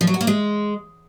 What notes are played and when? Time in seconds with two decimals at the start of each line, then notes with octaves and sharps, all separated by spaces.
0.01 F3
0.07 F#3
0.14 F#4
0.21 A#3
0.27 G#3